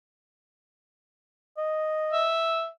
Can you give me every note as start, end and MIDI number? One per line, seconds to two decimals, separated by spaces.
1.57 2.32 75
2.13 2.66 76